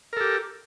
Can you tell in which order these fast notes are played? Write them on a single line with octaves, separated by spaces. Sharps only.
A#4 A4 G4